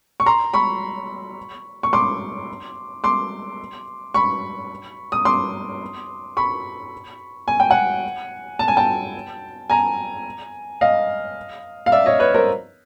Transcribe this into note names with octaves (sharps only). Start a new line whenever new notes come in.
C#6
A#5 C6
B5 C#6
C#6
C6 D6
C6 D6
B5 C#6
D#6
C6 D6
B5 C#6
G#5
G5
F#5 G#5
A5
G#5
G5 A5
G#5 A#5
D#5 F5
F5
D5 E5
C#5 D#5
B4 C#5
A#4 C5